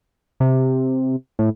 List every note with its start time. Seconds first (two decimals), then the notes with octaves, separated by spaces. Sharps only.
0.40 C3
1.39 A2